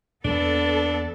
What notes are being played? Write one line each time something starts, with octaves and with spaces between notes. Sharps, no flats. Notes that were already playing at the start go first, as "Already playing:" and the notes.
E2 A#3 B3 D4 A4